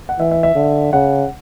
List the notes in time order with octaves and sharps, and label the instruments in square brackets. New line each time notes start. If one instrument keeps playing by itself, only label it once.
[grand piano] F#5
[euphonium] E3 [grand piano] E5
[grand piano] E5
E5
[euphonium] D3
[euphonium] C#3 [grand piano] F#5